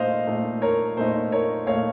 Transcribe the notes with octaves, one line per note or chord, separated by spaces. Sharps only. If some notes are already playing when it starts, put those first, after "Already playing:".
Already playing: A#2 A3 D#4 C5 D#5 F5
A#2 A3 D#4
A#4 C#5
A#2 A3 D#4 C5
A#4 C#5
A#2 A3 D#4 C#5 F5